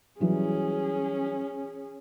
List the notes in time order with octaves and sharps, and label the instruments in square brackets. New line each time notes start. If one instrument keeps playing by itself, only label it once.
[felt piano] E3 F#3 G3 [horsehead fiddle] C#4 G#4